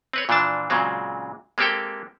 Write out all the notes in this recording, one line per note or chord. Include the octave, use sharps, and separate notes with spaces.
C4 B4 C#5
A#2 E3 F3 D4 A5
A#2 C#3 F#3 G#3 C4
G#3 A#3 C4 G4 A4 G5